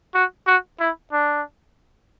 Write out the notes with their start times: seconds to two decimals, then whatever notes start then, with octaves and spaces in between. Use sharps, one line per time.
0.14 F#4
0.47 F#4
0.80 E4
1.12 D4